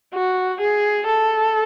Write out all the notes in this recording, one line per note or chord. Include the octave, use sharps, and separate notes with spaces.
F#4
G#4
A4